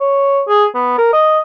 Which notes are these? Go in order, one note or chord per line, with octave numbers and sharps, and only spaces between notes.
C#5
G#4
B3
A#4
D#5